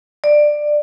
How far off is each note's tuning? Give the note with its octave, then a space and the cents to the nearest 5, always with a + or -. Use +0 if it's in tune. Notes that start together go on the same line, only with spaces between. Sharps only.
D5 +15